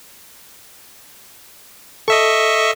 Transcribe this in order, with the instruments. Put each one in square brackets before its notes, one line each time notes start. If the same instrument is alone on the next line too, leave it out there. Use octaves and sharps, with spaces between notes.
[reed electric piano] A4 [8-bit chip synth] D#5 E5 C#6